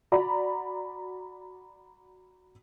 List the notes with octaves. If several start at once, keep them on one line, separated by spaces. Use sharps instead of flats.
F#4 D5 A#5 B5